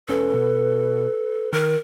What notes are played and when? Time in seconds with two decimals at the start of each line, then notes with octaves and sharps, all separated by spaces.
0.09 E1 C#4 A4 B4
0.34 B2
1.52 D#3 A#4